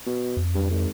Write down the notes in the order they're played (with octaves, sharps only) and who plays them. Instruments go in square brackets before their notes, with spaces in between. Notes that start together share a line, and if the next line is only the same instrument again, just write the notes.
[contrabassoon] B2
[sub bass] F2
[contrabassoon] G2
G#1